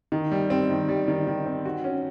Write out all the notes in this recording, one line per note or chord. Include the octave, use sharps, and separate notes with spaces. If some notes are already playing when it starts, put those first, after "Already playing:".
D#3
G3
C4
D#3
G3
D#3
D#3
C4
F#4
C#4